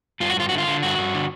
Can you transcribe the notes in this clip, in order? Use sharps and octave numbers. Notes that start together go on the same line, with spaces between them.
G2 F4
F#4
G2 F4
D3 F#4
F4
D3
G2 F#4
G2
D3